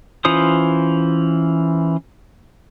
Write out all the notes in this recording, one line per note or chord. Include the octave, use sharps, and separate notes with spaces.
E3 C#4 F4 C5 D#6